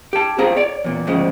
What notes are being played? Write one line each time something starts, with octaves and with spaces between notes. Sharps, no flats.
G4 A5
C4 F4 G#4 F5 A#5
C#5 D5
E2 A#2
D2 G#2 C#3 F3 G#3